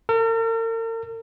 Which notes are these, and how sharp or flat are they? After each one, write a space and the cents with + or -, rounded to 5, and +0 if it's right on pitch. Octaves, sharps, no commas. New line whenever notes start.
A#4 -45